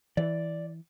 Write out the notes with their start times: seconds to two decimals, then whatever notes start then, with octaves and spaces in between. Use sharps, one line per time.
0.17 E3 D5